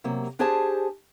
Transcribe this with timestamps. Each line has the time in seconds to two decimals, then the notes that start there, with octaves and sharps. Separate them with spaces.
0.04 C3 F#3 A#3
0.39 D4 G4 G#4 C5 G#5 A5